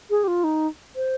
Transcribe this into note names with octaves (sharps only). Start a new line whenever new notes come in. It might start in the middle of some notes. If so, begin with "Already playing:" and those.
G#4
G4
F4
D#4
C5